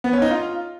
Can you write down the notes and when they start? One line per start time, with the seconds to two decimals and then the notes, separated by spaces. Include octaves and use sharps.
0.04 B3
0.13 C#4
0.22 D#4
0.31 F4